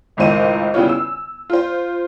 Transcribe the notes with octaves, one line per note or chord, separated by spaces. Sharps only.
G#1 C#2 A2 A#3 C5 D#7
C#3 G3 B3 E4 F4 C#5
E6
F4 C5